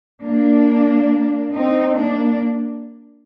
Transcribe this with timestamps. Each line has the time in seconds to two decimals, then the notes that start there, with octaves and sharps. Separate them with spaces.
0.23 A#3 D4
1.53 C4 D#4
1.97 A#3 D4